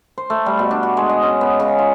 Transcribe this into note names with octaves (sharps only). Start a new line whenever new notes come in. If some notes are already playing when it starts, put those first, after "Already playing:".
C5
A3
G3
B2
D4
F#4
G#3
D#5
C#4
B3
C#3
F4